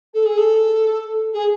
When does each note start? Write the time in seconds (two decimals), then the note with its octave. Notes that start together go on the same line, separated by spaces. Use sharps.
0.13 A4
0.25 G#4
0.37 A4
1.33 G#4